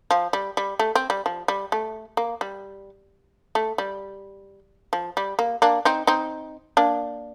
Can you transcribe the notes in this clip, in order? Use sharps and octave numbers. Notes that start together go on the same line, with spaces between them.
F3
G3
G3
A3
C4
G3
F3
G3
A3
A#3
G3
A3
G3
F3
G3
A#3
A#3 D4
C4 D#4
C4 D#4
A#3 D4